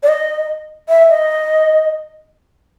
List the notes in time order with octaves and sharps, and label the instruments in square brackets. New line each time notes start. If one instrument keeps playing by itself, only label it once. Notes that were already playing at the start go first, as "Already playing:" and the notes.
[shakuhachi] D5
D#5
E5
D#5